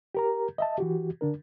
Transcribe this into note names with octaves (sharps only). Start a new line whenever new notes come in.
G4 A#4 A#5
D#5 E5 A5
E3 F#4 G4
D3 D4 A#4